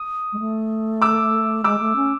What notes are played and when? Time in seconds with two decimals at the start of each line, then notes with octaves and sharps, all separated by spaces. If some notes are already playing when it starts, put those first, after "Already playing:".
Already playing: D#6
0.33 G#3
0.39 A3
1.02 D6 E6
1.64 G#3 D6 E6
1.79 A3
1.96 C#4